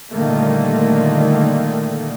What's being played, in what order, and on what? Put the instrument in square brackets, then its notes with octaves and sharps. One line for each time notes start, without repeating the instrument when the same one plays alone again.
[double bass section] A#2 D3 D#3 G3 A3 A#3